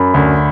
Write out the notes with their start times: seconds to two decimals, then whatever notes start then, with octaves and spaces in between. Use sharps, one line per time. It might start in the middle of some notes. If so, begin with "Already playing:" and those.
Already playing: F#2 B5
0.14 D2